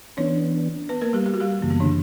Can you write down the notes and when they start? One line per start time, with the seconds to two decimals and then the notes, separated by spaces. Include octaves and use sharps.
0.17 E3 B3 C#4 D4 C#5
0.89 B3 B4
1.01 A#3 A#4
1.13 G3 G4
1.26 G4
1.34 F#4
1.40 G3 G4
1.61 F#2 C#3 E3 A#3
1.70 B3
1.80 D3 D4